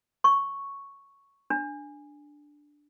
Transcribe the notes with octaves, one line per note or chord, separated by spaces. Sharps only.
C#6
D4